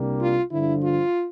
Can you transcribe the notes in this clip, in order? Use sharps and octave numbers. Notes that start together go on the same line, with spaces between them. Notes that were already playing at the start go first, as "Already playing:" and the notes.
Already playing: C2 C3 G3 A#3 D4
F4
G2 D3 F3 E4
F4